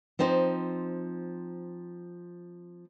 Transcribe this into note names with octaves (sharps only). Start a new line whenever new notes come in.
F3 C4 D#4 C5